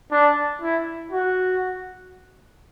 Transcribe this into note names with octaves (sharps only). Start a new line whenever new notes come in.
D4
E4
F#4